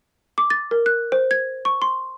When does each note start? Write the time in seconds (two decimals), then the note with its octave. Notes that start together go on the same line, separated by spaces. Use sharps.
0.38 D6
0.50 A6
0.71 A#4
0.86 F#6
1.12 C5
1.31 G#6
1.65 C#6
1.82 C6